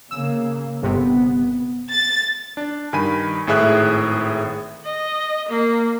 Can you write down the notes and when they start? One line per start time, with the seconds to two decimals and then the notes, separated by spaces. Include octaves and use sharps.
0.11 C#3 A#3 E6
0.82 G1 C3 B3
1.90 A6
2.57 D4
2.93 G2 D#3 G#5 B5 D#7
3.47 G#1 A2 G#4 E5 F#6
4.85 D#5
5.48 A#3